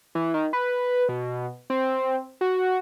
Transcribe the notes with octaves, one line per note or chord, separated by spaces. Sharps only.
E3
D#3
B4
B2
C4
F#4